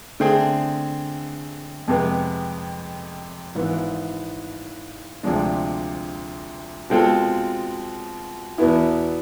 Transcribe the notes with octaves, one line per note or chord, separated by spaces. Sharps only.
D3 A3 C4 G#4
F2 C3 G#3 B3
G#1 G#2 E3 B3
D2 C3 F3 G#3 D4
B2 G#3 C4 F4 A4
E2 B2 B3 E4